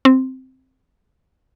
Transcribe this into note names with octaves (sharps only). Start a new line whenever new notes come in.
C4